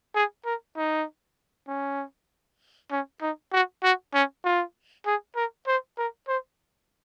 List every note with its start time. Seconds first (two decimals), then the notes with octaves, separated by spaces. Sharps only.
0.15 G#4
0.45 A#4
0.77 D#4
1.68 C#4
2.91 C#4
3.22 D#4
3.53 F#4
3.83 F#4
4.14 C#4
4.44 F4
5.06 G#4
5.36 A#4
5.67 C5
5.98 A#4
6.28 C5